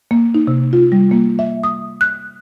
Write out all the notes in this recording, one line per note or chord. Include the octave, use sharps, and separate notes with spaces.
A#3
D#4
C3
F4
G3
A#3
E5
D#6
F#6